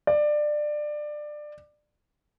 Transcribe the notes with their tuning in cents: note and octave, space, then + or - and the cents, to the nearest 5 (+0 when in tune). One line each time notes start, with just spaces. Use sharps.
D5 +20